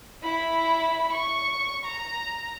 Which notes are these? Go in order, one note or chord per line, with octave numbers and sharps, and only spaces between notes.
E4 B5
C#6
A#5